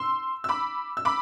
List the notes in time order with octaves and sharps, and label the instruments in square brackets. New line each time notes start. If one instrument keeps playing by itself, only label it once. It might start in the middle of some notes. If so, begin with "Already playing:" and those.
Already playing: [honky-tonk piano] C6 E6
E6
B5 D6
E6
B5 D6